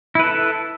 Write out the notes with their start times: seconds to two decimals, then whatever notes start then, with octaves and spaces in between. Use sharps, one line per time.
0.15 E4
0.19 B4
0.24 A4